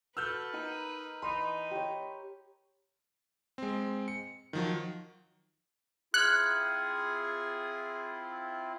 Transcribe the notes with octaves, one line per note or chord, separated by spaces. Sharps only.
F#4 A4 B4 E6 F6 G6
D#4 A#4 B5
E3 D#4 B5 C6
G4 C#5
G#3 C4
C#7
D#3 F3 F#3
C4 E4 F4 G#4 F6 F#6 G#6 C#7